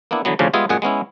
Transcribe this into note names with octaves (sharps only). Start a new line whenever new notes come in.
A#3 B3 D4 E4
D3 E3 F#3 B3
D2 A2 C#3 F3 C#4 D4
G3 G#3 B3 F4 G#4 E5
F#2 A#2 G#3 G#4 F#5
G#3 B3 C#4 E4